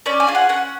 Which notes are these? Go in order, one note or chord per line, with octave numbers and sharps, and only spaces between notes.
C#4 D5
G#5
F4 G#4
F#5
C#4 F#5